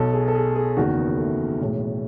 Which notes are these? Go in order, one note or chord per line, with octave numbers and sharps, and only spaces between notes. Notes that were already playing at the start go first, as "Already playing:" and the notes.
Already playing: B1 B2 A4
G#4
A4
G#4
G#4
F#1 E2 D#3 F#4
B3
A3
B1 A2 E3 G#3